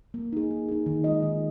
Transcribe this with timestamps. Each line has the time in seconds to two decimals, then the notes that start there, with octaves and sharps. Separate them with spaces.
0.14 A#3
0.33 D#4 G#4
0.51 A#3
0.68 D#4 G#4
0.86 D#3
1.04 G#3 F4 G#4 D#5
1.22 D#3